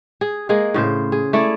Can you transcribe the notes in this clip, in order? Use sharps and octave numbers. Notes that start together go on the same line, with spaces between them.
G#4
G#3 A#3 G#4
A2 C#3 C5
G#4
A3 E4 G#4 D5